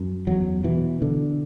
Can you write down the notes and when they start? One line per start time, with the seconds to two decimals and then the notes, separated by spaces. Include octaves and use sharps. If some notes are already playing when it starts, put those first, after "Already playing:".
Already playing: F#2
0.27 E2 F#3
0.64 B2 E3
1.01 B2 D3